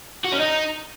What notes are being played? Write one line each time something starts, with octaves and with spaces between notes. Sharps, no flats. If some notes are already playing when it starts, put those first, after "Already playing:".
F#4
C#4
D#4